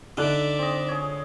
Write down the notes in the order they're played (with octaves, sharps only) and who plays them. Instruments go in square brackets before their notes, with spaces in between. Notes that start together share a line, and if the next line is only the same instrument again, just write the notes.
[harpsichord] D3 [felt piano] D#4 A4 F#6 [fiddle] D5 E5
[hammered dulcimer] C4 D#5
G#4 C#5